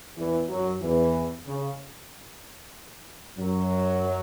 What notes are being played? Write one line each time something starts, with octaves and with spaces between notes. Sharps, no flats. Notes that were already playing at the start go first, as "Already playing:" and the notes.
E2 E3
F#2 F#3
E2 E3
C#3
F#2 F#3